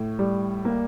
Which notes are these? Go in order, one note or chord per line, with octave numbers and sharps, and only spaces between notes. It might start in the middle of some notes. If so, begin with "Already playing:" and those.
Already playing: A2
G3
A#3